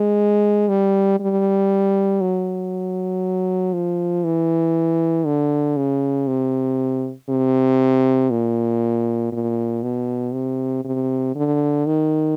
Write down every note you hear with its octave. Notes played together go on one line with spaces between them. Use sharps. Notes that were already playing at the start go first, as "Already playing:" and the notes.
Already playing: G#3
G3
G3
F#3
F3
E3
D3
C#3
C3
C3
A#2
A#2
B2
C3
C3
D3
D#3